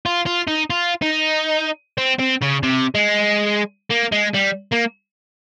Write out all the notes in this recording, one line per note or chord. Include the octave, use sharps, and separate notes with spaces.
F4
F4
D#4
F4
D#4
C4
C4
C#3
C3
G#3
A#3
G#3
G3
A#3